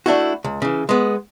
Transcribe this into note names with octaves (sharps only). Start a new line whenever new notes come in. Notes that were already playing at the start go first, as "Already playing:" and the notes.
A3 D4 E4 F#4
C#2
C#3 E3
G#3 B3